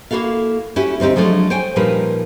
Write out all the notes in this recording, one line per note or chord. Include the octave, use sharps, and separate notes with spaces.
A#3 E4 F#4 A4 F5
C#4 E4 F#4 G4
D2 C4 D#4 G4
F3 F#3 G#3 A3 D4
C5 C#5 G5 G#5
A#2 F3 G3 D#4 A#4 B4